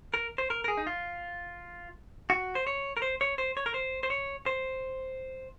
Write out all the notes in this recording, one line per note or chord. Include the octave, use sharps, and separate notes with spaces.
A#4
C5
A#4
A#4
G#4
D#4
F4
F#4
C5
C#5
A#4
C5
C#5
C5
C#5
A#4
C5
C5
C#5
C5